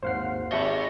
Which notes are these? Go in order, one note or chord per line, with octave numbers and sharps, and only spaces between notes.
G#1 D#2 C5 F5 F#5 C7
G#1 G4 D#5 E5 B5 C#6